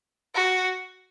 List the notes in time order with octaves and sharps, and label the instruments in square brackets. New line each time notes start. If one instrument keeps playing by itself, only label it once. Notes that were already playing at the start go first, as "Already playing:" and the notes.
[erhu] F#4